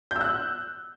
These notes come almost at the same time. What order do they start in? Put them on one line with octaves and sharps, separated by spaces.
G6 E6 F#6